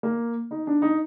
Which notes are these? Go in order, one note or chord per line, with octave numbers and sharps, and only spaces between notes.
A#3
D#4
D4
D#4